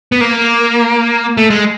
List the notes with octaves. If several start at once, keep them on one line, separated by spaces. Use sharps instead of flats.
B3
A#3
A3
G#3